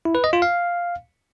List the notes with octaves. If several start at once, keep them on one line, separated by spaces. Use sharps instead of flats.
E4
B4
D#5
F4
F5